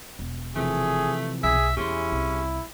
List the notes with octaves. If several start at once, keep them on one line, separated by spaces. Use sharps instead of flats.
E1
C3 E3 F3 A3 G#4
B1 G#4 E5
E2 C#4 E4 G4 G#4 C6
C2